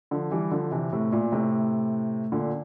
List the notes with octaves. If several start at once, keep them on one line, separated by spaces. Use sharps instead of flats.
D3 F3
E3 G3
D3 F3
C3 E3
A2 C3
A#2
A2 C3
A#2 D3